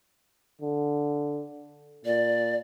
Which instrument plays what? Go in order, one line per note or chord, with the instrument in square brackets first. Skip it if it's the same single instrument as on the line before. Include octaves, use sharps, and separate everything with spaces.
[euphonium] D3
[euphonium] A#2 [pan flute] D5